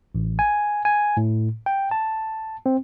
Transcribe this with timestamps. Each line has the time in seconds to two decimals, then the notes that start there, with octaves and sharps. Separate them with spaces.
0.15 A1
0.39 G#5
0.85 G#5
1.17 A2
1.66 G5
1.91 A5
2.66 C4